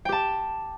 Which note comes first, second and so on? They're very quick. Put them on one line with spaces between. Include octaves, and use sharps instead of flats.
G5 G4 A5